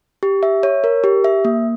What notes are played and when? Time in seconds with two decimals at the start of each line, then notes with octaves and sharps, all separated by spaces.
0.23 G4
0.43 E5
0.63 C#5
0.84 A#4
1.04 G4
1.24 E5
1.45 A#3